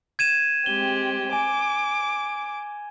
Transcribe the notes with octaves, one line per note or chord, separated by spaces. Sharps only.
G#6 D#7 E7
G#3 C4 G4 G7
G#5 D6